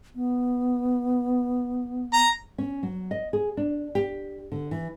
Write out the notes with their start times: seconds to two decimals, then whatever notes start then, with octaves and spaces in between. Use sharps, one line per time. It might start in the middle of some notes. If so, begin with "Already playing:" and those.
0.15 B3
2.13 A#5
2.58 C#4
2.83 F#3
3.11 D#5
3.33 G#4
3.57 D4
3.95 G4
4.52 D3
4.71 E3